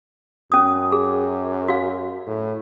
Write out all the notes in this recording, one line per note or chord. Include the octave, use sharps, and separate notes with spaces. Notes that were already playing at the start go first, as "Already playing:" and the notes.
F#2 C#4 D#6
G#4
F#4 F5
A2